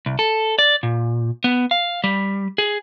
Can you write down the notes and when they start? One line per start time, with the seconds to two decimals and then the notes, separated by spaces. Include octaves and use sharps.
0.06 C2
0.19 A4
0.59 D5
0.83 A#2
1.44 B3
1.71 F5
2.04 G3
2.58 G#4